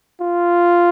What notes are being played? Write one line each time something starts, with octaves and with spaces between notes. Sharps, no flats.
F4